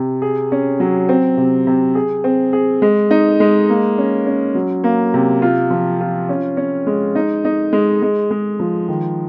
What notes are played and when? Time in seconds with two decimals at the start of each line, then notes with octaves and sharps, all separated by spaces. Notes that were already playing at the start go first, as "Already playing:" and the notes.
Already playing: C3
0.22 G#4
0.52 C#4
0.80 F#3
1.09 C4
1.37 C3
1.67 C3
1.95 G#4
2.24 C4
2.53 G#4
2.82 G#3
3.11 D#4
3.40 G#3
3.69 A#3
3.98 C#4
4.26 C#4
4.55 F#3
4.84 A#3
5.14 C3
5.42 F4
5.71 F3
6.00 F4
6.29 C#4
6.57 C#4
6.87 G#3
7.15 D#4
7.45 D#4
7.73 G#3
8.02 G#3
8.31 G#3
8.60 F3
8.88 D#3